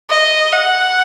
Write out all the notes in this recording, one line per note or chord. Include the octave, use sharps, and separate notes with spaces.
D#5
F#5